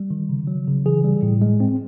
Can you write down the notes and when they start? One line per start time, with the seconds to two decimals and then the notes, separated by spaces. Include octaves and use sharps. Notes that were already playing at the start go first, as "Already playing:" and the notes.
Already playing: G3
0.11 D#3
0.29 C#3
0.47 F#3
0.67 C#3
0.86 E3 G#4
1.04 G3
1.22 A2
1.42 G#3
1.60 C4